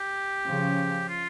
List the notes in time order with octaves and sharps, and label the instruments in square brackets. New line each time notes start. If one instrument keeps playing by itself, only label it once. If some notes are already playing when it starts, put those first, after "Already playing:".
Already playing: [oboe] G4
[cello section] C#3 F3
[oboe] F4